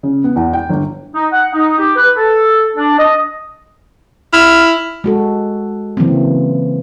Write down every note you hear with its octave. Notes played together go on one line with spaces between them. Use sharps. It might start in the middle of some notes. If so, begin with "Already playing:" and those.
C#3
B3
E2
G5
G1
D#4
F#5
D#4
G4
B4
A4
D4
D#5
E4 F6
G#3 F#4 A4
C#3 E3 F#3 A#3 C4